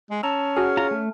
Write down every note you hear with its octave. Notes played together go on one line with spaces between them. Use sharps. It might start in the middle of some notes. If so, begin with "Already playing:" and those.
G#3
C#4 A5 A#5 E6
F#4 G#4 F6
F4 A#5
A3